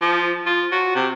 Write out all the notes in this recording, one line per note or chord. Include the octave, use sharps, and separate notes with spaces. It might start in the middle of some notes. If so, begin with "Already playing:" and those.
F3
F4
F#4
C3